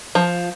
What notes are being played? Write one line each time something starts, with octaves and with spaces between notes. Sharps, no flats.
F3